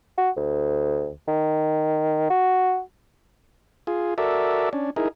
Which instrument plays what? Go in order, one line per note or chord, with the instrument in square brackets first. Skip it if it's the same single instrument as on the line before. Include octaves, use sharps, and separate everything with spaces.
[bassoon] F#4
D2
D#3
F#4
[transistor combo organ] F4 G#4
F#4 A4 A#4 D5 E5
C#4 D4
D#4 E4 G#4 A#4